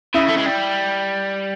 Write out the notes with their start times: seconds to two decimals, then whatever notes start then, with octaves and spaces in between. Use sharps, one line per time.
0.14 C#3 E4
0.28 A3
0.37 G#3
0.46 G3